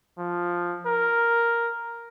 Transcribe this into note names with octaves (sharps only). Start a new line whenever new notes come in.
F3
A#4